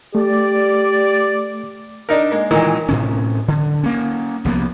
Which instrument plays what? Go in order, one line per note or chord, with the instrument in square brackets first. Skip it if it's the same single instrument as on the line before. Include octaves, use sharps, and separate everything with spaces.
[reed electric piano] A3 [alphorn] G4 [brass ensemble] D5
[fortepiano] D4 D#4 A#4
G#3 A#3
A#2 D#3 E3 G#3 A#3
[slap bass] A2 C3 C#4
D3
A#3 C#4
C2 F3 A#3 B3